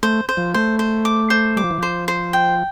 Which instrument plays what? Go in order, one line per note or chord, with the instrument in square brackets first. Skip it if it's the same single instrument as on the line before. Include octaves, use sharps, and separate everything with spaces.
[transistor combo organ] A3 [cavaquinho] C5
[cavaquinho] C5
[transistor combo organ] F3
[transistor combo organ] A3 [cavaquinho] C5
[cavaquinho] C5
D6
C5
[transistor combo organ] G3 [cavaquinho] D6
[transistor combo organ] F3
E3
[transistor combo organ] F3 [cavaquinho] C5
[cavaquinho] C5
G5